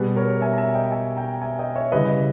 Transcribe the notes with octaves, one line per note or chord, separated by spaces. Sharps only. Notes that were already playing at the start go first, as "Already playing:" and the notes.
Already playing: B2 G3 G#4 B4
A#4 C#5
E5 G#5
A#5
E5 G#5
D#5 G5
E5 G#5
G5 A#5
E5 G#5
D#5 G5
C#5 E5
C#3 E3 G3 B4 D#5